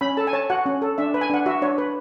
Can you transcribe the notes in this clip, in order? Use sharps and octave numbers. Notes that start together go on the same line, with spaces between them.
C#4 B5
A4 A5
G#5
C#5 A5
F#4 F#5
C#4
A4
D4 E5
B4
G#5
D4 F#5
F#4 E5
D4 C#5
B4